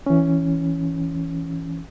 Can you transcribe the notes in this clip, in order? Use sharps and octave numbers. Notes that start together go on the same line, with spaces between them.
E3 C#4